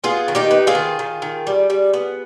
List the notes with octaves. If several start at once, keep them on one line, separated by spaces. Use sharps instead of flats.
B3 F4 G#4
D#3
D#4 G4
B3
F4 G#4
D#3
D#3
D#3
G3
G3
B3